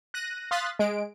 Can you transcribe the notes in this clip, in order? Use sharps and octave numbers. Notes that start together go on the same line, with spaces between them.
F#6 A#6 D#7
F5 C6 D#6 F#6 A6 B6
G#3 D7